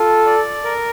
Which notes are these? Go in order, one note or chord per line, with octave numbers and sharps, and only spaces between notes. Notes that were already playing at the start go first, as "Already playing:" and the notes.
Already playing: F4 A4
D5
A#4